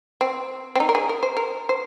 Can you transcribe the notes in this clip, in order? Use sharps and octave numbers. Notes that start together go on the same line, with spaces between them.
C4
C4
D#4
A#4
G#4
A#4
C5
A#4
C5